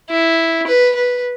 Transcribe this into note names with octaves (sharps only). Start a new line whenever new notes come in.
E4
B4
B4